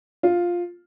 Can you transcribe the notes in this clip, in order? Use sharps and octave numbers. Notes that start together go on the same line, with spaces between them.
F4